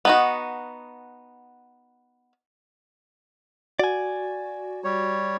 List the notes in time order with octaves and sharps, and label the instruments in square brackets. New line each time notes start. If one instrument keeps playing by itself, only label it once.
[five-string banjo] B3 D#4 F#4
[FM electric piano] F#4 [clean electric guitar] D5 G#5
[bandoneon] G3 C#5